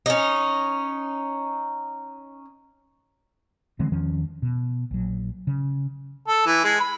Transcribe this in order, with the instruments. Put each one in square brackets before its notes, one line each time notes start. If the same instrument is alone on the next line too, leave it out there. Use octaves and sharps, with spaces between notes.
[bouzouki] C#4 D#4
[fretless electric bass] D3 E3 G#3 C4
E2 D#3 F3 C#4
B2
A#1 F#3
C#3
[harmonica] A4
E3
G#3
B5